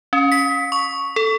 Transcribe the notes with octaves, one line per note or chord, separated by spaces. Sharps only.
C#4
B6
C#6
A4